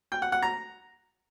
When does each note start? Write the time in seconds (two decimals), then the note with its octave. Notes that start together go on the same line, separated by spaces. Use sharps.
0.12 G5
0.22 F#5
0.32 F#5
0.42 A#5